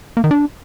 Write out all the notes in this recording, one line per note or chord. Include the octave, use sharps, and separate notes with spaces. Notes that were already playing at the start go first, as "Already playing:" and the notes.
A#3
D#3
D4